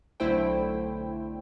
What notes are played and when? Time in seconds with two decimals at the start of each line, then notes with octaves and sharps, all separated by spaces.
0.20 B1 D3 A3 E4 C5 G5